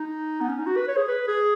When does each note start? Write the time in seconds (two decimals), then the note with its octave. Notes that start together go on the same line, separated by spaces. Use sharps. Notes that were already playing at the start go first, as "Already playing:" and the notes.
Already playing: D#4
0.41 B3
0.49 C#4
0.59 D#4
0.66 F#4
0.77 B4
0.88 C#5
0.97 G#4
1.08 B4
1.28 G#4